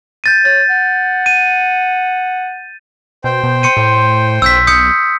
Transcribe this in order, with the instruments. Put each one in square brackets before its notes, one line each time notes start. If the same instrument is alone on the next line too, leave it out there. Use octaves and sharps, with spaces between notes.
[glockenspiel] G6 A6 D#7
[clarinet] C#5 [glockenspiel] A6
[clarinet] F#5
[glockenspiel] D#7
[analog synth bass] B2 [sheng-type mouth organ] C5 G5
[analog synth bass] B2
[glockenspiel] C6 C#7 D#7
[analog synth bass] A2
[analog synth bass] B1 [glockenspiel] E6 G6 B6
[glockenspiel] D#6 G6 C#7